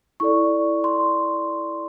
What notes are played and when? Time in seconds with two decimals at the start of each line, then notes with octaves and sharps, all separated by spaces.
0.20 E4 A4 D5 C#6
0.84 C6